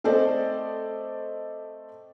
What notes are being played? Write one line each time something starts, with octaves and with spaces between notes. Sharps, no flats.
A3 C4 A4 C5 D5 D#5